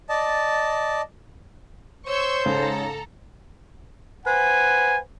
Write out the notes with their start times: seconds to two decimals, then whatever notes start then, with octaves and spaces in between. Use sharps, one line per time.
0.09 D5 D#5 A5
2.07 C5 C#5 C#6 E6 G6
2.46 G#2 C#3 A4 A#5
4.26 B4 C5 F#5 G#5